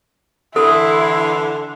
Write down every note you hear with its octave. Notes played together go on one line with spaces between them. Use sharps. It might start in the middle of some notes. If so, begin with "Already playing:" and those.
D3 E3 E4 A4 C6